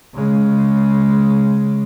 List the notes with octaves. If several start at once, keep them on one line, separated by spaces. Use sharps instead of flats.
C#3 G#3